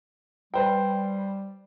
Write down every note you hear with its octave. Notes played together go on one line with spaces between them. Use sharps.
G3 B4 C5 G5